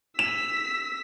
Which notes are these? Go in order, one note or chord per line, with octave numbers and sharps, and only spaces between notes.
E6 B6 E7